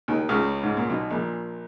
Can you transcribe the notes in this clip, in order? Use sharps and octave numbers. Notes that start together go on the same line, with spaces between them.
D#2 D#3
C#2 C#3
G#2
A#2
B1 B2
A#1 A#2